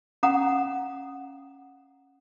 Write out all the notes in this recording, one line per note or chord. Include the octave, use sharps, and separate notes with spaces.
C#4 F5 F#5 A#5 D#6